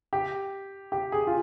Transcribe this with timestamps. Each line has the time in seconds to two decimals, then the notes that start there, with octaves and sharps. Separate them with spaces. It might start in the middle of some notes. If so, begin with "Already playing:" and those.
0.13 G4
0.92 G4
1.12 G#4
1.27 F4